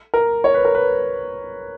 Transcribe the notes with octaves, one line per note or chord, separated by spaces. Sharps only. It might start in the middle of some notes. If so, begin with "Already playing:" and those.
A#4
C#5
B4
A#4
B4